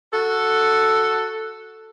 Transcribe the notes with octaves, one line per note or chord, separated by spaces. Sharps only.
F#4 A4